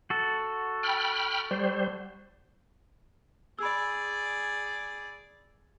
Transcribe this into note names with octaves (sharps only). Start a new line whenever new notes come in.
F#4 A4
G5 B5 F6
G3 C5
G#4 D5 B5 E6